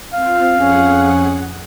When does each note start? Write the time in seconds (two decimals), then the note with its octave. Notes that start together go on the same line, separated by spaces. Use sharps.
0.14 C4 F4 F5
0.55 F2 C#4 G#4 F#5